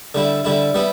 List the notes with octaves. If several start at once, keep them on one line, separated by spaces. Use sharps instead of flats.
D3 G3 E4
D3 G3 E4
G3 B3 E4